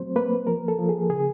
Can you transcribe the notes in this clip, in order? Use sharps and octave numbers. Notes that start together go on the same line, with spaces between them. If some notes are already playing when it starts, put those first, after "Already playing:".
Already playing: F#3 A3 C4 C5
A#3 B4
F3 A#4
A4
F3
G#4
C#3 G#4